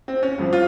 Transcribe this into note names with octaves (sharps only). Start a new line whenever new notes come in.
C4
C#4
G#1 G2 F3
F4